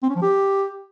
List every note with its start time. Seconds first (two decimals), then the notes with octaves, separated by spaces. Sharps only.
0.03 C4
0.09 C#4
0.16 F3
0.22 G4